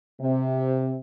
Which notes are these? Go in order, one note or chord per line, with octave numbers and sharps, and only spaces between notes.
C3